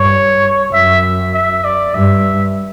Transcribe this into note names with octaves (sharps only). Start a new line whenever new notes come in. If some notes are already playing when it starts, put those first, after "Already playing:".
Already playing: G2 C#5
F#2 E5
E5
D5
G2 E5